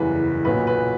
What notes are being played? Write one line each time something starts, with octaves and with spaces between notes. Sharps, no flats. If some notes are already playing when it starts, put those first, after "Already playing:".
Already playing: F#1 E2 C#3 E3 G3 B4
B1 A#2 F#3 B4
B4